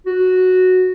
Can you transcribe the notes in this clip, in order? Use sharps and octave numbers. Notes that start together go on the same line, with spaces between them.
F#4